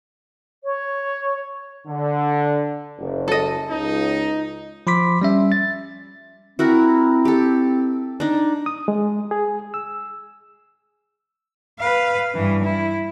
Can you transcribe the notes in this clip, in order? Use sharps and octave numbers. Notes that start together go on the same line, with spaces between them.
C#5
D3
F#1
A4 D#5
C#2 D#4
F3 B5 C6 D6 B6
G3 C#4 E5
A6
C4 E4 F#4 A#4
G4 A4
D4 D#4
D#6
G#3
G#4
E6
B4 F5
G2 E3
E4